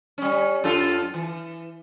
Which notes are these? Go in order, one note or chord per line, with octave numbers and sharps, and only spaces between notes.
G3 C#4
F#2 F4 A4
E3